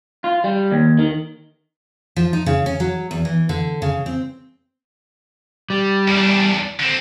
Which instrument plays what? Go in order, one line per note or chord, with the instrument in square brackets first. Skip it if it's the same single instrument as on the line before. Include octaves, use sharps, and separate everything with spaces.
[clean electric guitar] F4
G3
D#2
D#3
[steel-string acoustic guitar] F3
D#4
C#3
C#4
F#3
E2
E3
D3
C#3
C4
[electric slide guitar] G3
[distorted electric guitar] E2 D4
D3 C4